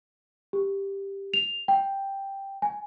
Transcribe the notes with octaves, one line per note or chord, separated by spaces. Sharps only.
G4
F7
G5
G#5